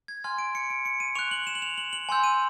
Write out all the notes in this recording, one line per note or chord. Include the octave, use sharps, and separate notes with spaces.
G#6
G#5 C6 F6 G#6
D7
C#7
D7
C#7
D#7
C#6 F#6 F7
F#7
E7
F#7
F7
F#7
F#7
G#5 C6 E6 G6
D#7